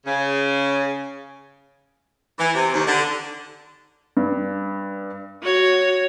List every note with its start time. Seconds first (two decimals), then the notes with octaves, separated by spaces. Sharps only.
0.06 C#3
2.39 E3
2.54 C3
2.73 D#2
2.86 D3
4.17 G2
5.42 F#4 C#5